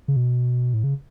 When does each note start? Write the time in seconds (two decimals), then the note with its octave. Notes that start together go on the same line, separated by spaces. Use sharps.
0.08 C#3
0.16 B2
0.74 A2
0.84 C#3